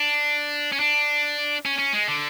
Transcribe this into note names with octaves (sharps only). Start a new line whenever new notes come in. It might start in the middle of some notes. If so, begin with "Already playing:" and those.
Already playing: D4
C#4
D4
C#4
C#4
G#3
D3